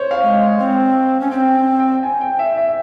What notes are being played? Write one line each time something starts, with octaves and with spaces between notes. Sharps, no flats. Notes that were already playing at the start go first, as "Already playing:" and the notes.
Already playing: C5 C#5
F5
G#3
C4
C#4
C4 G5
G5
G#5
G5
E5
E5